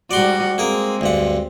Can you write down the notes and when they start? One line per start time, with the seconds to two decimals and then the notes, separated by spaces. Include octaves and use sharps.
0.11 G#2 G3 F#4 D5 C6
0.58 G#3 A#3 C4 G#4 A#4
1.01 D2 G2 F#5